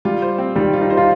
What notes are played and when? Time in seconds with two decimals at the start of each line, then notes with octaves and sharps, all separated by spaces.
0.05 G3 F4
0.22 C5
0.38 C4
0.56 D#3 G3
0.73 F4
0.81 D#4
0.90 C5
0.97 F4